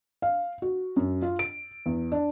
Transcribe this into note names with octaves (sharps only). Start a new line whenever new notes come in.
F5
F#4
F#2
F4
D7
E2
D4